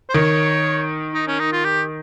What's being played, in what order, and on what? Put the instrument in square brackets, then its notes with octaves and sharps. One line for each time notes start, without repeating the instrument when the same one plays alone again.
[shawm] C5
[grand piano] D#3 [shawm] C#5
[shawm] D#4
C#4
D#4
F4
G4